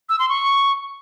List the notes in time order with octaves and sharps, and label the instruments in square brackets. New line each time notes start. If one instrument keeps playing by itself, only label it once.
[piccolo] E6
C6
C#6